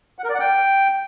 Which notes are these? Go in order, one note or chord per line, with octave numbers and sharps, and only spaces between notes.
F#5
A#4
D5
F#5
G5